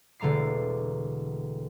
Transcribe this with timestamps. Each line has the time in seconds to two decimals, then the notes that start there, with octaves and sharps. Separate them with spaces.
0.20 E1 D3 A3 A#5 D6 C7